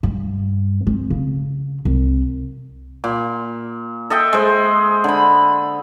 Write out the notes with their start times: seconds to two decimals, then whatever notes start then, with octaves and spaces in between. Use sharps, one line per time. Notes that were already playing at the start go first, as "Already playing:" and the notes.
0.03 G2
0.87 C4
1.10 C#3
1.85 C2
3.04 A#2
4.10 A4 D#5 E5 G5
4.33 G#3 C5
5.04 D3 B5